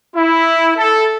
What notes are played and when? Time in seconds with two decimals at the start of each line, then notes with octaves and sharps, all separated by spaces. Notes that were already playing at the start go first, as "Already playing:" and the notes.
0.14 E4
0.77 A4